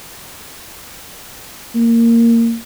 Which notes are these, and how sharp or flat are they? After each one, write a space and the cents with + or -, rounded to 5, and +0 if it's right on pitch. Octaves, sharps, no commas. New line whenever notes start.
A#3 -15